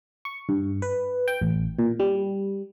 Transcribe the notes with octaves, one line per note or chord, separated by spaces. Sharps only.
C#6
G2
B4
G5
A1
A#2
G3